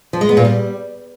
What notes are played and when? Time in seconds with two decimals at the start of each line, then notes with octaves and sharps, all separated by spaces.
0.13 F3
0.21 G#3
0.29 B3
0.37 A#2
0.45 G3